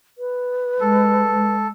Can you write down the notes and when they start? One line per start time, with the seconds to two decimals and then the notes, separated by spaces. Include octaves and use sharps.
0.18 B4
0.80 G#3 A4